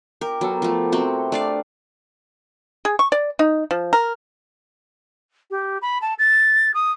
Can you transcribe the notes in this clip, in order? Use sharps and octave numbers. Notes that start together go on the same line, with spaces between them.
G4 A#4
F#3 B3 A4 A#4
F3 A3
C3 C4 F#4 C6
A3 D4 D5 F5
G#4
C#6
D5
D#4
F3
A#4
G4
B5
A5
A6
D#6